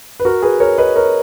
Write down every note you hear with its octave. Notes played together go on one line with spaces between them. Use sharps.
B4
F#4 A#4
G#4 B4
A#4 C#5
B4 D#5
A#4 C#5